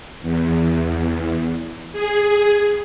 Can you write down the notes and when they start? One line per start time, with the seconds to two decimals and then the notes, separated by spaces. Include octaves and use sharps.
0.22 E2
1.93 G#4